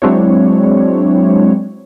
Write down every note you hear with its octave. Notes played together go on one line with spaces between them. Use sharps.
F#3 G#3 C4 D4 E4 C#5